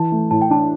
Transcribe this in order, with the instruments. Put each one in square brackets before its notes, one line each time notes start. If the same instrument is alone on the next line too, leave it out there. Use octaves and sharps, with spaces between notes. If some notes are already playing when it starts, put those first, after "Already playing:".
Already playing: [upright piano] E3 [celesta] A5
[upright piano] A3
[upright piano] A2 [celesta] A5
[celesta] G5
[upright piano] D4 [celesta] A5